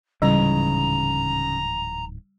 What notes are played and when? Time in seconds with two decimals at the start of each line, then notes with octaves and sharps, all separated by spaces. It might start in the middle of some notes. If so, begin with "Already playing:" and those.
0.22 D1 G#2 C#3 E3 G3 A#5